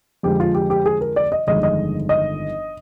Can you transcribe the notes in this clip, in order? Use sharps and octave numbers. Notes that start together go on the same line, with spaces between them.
F2 D3 G#3 G4
F4
G4
G4
G#4
A#4
D5
D#5
G1 F2 D#3 G#3 D#5
D#5
D#5